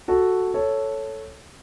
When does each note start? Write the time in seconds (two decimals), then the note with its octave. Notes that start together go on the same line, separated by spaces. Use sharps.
0.08 F#4 A4
0.54 A4 C#5